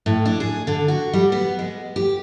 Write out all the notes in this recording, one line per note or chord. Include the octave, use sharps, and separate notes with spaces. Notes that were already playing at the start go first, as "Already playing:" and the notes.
A2
D4
G#4
D3
F#4
G3
B3
G#3
G4